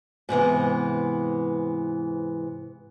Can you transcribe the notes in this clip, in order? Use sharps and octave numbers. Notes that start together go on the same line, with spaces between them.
G#2 C3 E3 B3